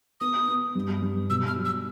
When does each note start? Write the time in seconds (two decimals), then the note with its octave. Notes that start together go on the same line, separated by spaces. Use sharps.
0.21 B3 D#6
0.48 B3
0.75 G2
1.02 G2
1.30 B2 E6
1.47 F6
1.56 F#3
1.65 E6